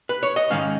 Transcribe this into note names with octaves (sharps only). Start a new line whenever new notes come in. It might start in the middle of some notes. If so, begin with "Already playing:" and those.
B4
C#5
D#5
G#2 D#3 G#3 C#4 F5